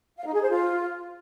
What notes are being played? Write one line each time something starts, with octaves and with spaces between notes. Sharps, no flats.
F5
D#4
G#4
C5
F4